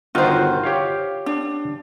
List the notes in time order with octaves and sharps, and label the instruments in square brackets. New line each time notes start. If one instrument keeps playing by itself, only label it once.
[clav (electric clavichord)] G1 D#3 F#4 [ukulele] F4 C5
[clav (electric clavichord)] G4 C#5 F5
[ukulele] D4